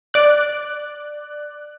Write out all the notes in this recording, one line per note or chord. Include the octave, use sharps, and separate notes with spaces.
D5 F#6